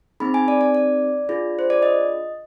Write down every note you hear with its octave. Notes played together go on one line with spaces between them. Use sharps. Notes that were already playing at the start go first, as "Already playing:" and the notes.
C4 D#4 G#4 B5
G#5
D5
D5
D5
D4 F4 G#4
C5
D5
D#5